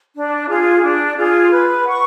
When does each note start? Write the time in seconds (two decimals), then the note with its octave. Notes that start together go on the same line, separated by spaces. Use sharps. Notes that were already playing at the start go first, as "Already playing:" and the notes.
0.15 D4
0.48 F4 G#4
0.82 D4
1.16 F4 G#4
1.51 B4
1.84 F#5 C#6